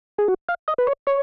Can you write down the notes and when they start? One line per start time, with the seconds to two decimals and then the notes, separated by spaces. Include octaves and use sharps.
0.18 G#4
0.28 F#4
0.49 F5
0.68 D#5
0.78 B4
0.87 C#5
1.07 C#5